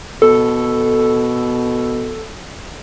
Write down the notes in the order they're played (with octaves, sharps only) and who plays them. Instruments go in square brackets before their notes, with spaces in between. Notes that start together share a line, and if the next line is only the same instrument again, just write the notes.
[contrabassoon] B2 [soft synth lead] A4